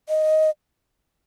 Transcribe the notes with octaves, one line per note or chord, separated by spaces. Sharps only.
D#5